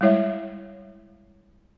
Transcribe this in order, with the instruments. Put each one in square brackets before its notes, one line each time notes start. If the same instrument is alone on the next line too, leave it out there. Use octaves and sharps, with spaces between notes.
[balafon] G3 G#3 E4 C#5 E5